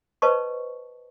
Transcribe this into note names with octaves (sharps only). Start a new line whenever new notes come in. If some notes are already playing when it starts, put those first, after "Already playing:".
B4 C5 D#5 A5 C#6